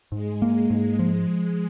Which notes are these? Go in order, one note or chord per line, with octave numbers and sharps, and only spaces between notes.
G#2 G#3
A#3
G#2
F3